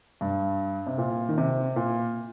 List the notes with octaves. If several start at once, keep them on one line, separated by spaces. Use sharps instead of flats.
G2
C3
A#2
D#3
C3
A#2